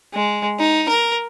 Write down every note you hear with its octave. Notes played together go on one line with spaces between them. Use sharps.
G#3
D#4
A#4